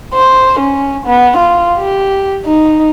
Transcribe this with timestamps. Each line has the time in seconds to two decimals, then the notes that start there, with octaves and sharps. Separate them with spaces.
0.14 C5
0.60 C#4
1.06 B3
1.38 F4
1.79 G4
2.46 D#4